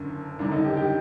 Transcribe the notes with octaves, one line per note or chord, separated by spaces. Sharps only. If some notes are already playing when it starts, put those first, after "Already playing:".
Already playing: F#1 F#2 D3
F#1 F#2 D3 D4
D#4
G4
G4